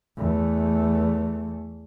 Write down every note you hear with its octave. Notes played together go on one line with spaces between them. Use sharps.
E2 A3